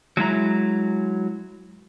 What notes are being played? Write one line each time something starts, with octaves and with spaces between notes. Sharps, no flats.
F#3 G#3 E4 A#5